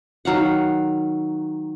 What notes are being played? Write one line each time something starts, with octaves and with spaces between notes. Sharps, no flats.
D#3 F#3 F5 F#5